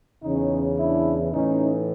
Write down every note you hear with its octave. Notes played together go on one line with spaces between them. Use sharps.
E2 C#3 E3 C#4 D#4
D4 E4
A2 E3 C#4 D#4